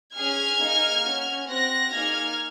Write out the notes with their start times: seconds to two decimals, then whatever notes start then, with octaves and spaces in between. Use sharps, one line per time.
0.15 C#4 G#4 F6 G#6
0.60 A#3 D#4 G#4
1.04 C#4 F#4
1.48 C4 F#4 F#6 A#6
1.92 A#3 D#4 G#4 F6 G#6